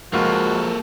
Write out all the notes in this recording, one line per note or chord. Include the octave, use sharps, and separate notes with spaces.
C#2 F3 G#3 A#3 F4 F#4 A4 A#4